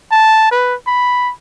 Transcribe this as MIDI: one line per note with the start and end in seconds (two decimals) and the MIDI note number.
0.11 0.51 81
0.51 0.75 71
0.87 1.32 83